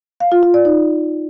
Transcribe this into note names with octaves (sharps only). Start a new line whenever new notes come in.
F5
F4
F4
D5
D#4